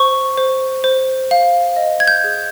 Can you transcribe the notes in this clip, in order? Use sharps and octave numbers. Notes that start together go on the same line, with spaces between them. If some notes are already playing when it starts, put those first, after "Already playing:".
Already playing: C5 C#6
C5
C5
F5
D#5
G#6
G6
G#4